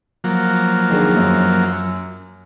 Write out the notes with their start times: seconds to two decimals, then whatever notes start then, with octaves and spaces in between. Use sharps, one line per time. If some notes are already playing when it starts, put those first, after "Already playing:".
0.24 F3 F#3 A#3
0.90 D#3 D4 G#4
1.17 F#2